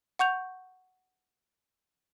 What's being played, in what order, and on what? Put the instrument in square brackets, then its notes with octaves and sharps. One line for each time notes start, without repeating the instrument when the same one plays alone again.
[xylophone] F#5 C#6 G6 F7